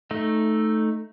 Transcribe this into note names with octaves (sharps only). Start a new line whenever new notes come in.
A3 D#4